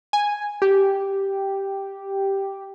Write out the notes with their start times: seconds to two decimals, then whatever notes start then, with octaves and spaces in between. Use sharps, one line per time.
0.13 G#5
0.62 G4